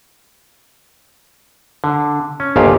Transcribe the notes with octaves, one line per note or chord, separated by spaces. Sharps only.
D3
C#4
G1 D#2 A#2 F4 G4 F5